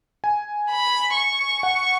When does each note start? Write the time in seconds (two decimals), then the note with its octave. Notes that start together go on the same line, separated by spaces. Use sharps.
0.24 G#5
0.70 B5
1.17 C#6
1.63 F#5